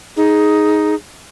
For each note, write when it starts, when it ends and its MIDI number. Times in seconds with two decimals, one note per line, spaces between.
0.17 0.95 63
0.17 0.94 68